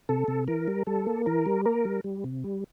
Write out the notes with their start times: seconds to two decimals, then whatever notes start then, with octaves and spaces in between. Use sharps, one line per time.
0.09 C3 A4
0.28 C3
0.48 E3 A#4
0.68 G3
0.87 G3 A4
1.06 A#3
1.26 E3 A#4
1.46 G3
1.66 A#3 A#4
1.85 G3
2.04 G3
2.24 C3
2.44 G3